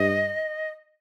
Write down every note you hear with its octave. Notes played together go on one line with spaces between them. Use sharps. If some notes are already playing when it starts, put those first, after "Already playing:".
Already playing: G2 D#5